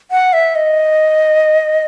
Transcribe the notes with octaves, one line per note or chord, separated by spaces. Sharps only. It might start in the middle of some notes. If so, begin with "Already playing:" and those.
F#5
E5
D#5